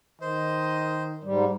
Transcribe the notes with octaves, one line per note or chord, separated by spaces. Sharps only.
D#3 C5 D#5
G#2 G3